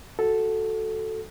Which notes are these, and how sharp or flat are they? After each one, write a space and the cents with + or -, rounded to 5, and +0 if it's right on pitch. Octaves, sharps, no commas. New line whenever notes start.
F#4 +0 A4 +0